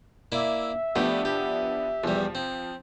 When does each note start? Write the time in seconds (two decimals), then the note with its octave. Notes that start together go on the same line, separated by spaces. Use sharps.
0.32 A#3 E4 D5 E5
0.96 F3 A3 B3 D4 G4
1.25 G4
2.04 E2 F3 G3
2.35 C4